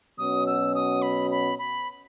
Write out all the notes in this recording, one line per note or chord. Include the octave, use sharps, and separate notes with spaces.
B2 F#3 C#4 F#4 D#6
E6
D#6
B5
B5
B5